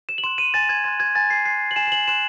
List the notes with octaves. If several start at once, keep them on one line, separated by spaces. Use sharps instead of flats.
E7
F#7
C6 F#6 E7
D#7
G#5 A6
G#6
C6 F#6 A6
G#6
G#5 A6
C7
C6 F#6 C7
F#7
G#5 E7
E7
F#7
C6 F#6 E7